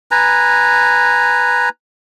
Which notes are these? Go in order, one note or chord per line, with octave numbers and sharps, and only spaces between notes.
B4 G#5 A#5